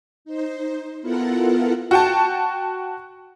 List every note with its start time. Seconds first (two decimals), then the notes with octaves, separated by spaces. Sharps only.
0.25 D#4 C5
1.02 B3 E4 F4 A4 A#4 F#5
1.91 F#4 G5 A5